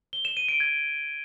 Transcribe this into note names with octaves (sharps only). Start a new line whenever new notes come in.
G7
E7
D#7
D7
G#6